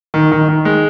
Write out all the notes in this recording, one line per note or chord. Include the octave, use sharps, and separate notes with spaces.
D#3
D#3
D#3
G#3